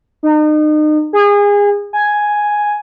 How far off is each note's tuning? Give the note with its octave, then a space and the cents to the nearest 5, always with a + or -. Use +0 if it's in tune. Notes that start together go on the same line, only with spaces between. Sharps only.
D#4 -35
G#4 -30
G#5 +5